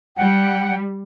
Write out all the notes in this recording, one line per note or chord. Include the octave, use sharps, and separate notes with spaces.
G3 F#5 G5